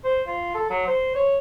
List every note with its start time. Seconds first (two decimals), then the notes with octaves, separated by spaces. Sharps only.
0.04 C5
0.27 F4
0.55 A4
0.70 F#3
0.87 C5
1.15 C#5